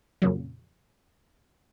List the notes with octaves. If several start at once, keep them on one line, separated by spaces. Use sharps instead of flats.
F2 A#2 C#3 F#3